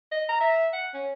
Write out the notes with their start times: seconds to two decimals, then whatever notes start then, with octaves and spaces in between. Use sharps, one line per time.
0.12 D#5
0.29 A#5
0.41 E5
0.73 F#5
0.94 C#4